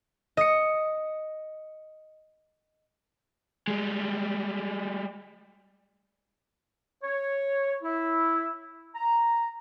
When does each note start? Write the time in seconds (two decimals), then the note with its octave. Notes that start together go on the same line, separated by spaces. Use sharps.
0.37 D#5 C#7
3.68 G3 G#3
7.03 C#5
7.83 E4
8.94 A#5